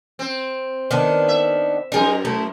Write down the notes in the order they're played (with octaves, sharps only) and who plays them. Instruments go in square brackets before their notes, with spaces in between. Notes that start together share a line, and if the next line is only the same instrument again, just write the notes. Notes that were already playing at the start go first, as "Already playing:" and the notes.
[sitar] C4
[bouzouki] D#3 B3 D4
[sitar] E5
[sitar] F#2 D#3 A#4 [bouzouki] D#4 G#4
[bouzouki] A3 E4 A4